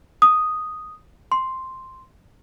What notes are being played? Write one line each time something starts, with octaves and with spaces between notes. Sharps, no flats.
D#6
C6